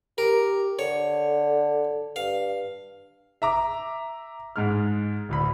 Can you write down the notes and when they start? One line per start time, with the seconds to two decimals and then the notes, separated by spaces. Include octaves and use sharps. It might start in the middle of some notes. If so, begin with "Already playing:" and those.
0.18 G4 A#4
0.79 D3 C#5
2.16 G2 F5
3.42 E5 A#5 D6
4.56 G#2 G#3 F6
5.29 D1 D2 B5